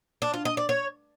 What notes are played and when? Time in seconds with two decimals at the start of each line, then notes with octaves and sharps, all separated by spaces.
0.22 D4
0.34 F4
0.45 D#5
0.57 D5
0.69 C#5